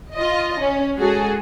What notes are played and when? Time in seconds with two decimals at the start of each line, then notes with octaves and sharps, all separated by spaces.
0.15 F4 D#5
0.60 C#4
0.96 G#3 F#4 G#4 A4